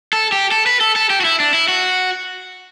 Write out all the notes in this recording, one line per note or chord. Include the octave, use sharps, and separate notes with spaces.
A4
G4
A4
B4
A4
A4
G4
F#4
E4
D4
E4
F#4